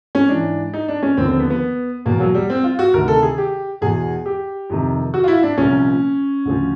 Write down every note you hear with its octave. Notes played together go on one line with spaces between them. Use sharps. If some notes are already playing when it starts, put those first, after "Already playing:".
C#4
G#2 E3 D4
D#4
D4
C#4
D#2 D3 F3 C4
C4
B3
B3
E2 B2 A#3
F#3
G3
C4
F4
F#4
D2 C3 D#3 A#4
A4
G#4
G4
E2 B2 G#4
G4
F2 C3 D#3
F#4
F4
E4
D4
C2 A#2 F3 C#4
D2 C#3 F3